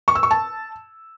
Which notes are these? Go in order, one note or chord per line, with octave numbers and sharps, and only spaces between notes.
C#6
E6
C#6
A5